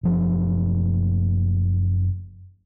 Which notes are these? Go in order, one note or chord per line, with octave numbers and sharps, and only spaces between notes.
F#1 F3